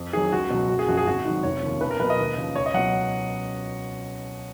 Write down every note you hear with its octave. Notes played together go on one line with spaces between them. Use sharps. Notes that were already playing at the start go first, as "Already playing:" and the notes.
Already playing: F2
D#3 F#3 G#4
C#2 F#4
B2 F#3
F#1 F#4
G#4
F#2 F3 F#4
G#4
G#1 F#4
G#2 D#3 F#3
F1 C#5
D#2 C#3 F3
B1 B4
A#4
B2 F#3 B4
D#5
D#2
C#3 F3
C#2 C#5
D#5
B2 F#3 F#5